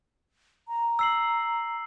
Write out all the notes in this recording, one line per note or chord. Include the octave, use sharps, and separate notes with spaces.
A#5
E6 C7 F#7